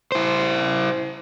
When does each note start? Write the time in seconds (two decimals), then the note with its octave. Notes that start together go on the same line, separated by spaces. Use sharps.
0.12 E4 C5